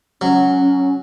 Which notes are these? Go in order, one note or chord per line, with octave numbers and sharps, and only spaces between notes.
F#3 C#4